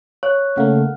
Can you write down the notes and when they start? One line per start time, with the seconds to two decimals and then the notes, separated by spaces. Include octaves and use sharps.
0.23 C#5 F5 C#6 F#6
0.57 C#3 A3 A#3 F5 F#5 F6